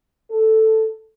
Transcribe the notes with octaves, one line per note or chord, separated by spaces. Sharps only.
A4